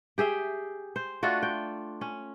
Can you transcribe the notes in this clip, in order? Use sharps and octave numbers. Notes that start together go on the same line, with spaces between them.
G4 G#4 E5 G5
C5
A3 D4 F4 F#4
G5
C#4